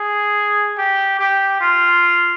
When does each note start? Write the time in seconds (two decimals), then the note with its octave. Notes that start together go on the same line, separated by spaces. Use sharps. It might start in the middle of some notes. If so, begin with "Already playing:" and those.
Already playing: G#4
0.78 G4
1.19 G4
1.61 F4